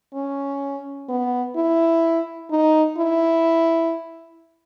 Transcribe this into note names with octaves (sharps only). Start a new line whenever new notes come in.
C#4
B3
E4
D#4
E4